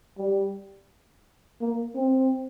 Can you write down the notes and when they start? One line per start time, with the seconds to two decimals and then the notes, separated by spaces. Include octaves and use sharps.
0.18 G3
1.61 A#3
1.95 C4